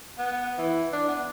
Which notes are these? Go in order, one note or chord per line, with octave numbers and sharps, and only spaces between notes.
B3
E3
D4
B3